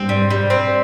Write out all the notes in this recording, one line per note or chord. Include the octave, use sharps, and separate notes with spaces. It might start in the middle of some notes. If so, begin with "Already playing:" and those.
Already playing: G2 C4
G3
G3
C4